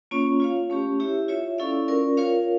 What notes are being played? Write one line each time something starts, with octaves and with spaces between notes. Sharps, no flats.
A#3 C#4 F4 C#5
F4 C#5 F5
A3 C#4 G4
E4 G4 C#5 E5
F4 C#5 E5
C#4 E4 A4 D5 F5
C#4 F4 A#4 D5
F4 A#4 C#5 F5